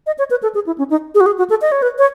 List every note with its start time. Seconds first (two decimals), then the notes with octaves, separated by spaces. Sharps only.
0.06 D#5
0.18 C#5
0.31 B4
0.43 A4
0.55 G#4
0.67 E4
0.78 C#4
0.90 D#4
1.15 G#4
1.21 F#4
1.26 G#4
1.38 F#4
1.50 A4
1.61 D#5
1.72 C#5
1.82 B4
1.98 C#5